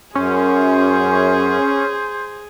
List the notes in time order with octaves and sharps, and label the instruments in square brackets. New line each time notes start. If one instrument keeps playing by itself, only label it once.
[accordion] F#2 [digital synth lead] C#4 [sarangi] G#4 [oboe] C5